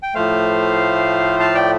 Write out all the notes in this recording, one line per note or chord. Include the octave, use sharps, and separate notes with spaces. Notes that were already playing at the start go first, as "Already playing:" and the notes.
G5
A2 F3 A3 C5 F5
F5 A5
D5 G5